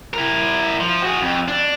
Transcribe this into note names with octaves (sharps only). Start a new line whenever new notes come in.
E4 A#4
F3
F#4 G#4
F2
D4